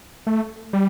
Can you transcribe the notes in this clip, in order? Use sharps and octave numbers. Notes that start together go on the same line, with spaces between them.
A3
G3